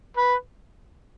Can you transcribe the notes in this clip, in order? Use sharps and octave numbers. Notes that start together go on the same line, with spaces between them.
B4